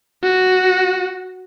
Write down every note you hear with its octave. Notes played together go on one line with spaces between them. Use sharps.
F#4